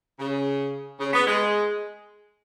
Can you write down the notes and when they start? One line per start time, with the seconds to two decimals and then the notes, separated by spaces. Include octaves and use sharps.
0.19 C#3
1.00 C#3
1.13 B3
1.27 G#3